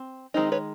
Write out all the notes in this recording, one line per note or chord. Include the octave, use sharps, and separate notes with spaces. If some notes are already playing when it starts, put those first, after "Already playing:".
Already playing: C4
D#3 G#3 C4 D#4
B4 C#5